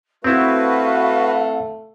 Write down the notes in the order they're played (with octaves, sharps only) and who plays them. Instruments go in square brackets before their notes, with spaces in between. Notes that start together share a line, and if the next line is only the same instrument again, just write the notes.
[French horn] A3 [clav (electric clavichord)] C4 E4 [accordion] F#4 B4 [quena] F5